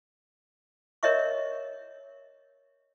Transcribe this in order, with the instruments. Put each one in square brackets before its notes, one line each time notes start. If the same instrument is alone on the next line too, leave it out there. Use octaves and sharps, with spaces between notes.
[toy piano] A#4 C#5 D#5 E5 C#6